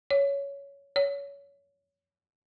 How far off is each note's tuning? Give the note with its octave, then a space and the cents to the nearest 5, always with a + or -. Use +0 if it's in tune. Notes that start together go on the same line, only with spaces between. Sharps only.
C#5 +10
C#5 +25